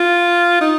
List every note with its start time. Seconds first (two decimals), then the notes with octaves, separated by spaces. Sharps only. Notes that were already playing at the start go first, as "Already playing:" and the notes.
Already playing: F4
0.61 D#4